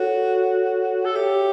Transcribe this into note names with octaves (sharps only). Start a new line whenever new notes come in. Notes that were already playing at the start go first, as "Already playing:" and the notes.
Already playing: F#4 A4 C#5
A4
G4 C#5 E5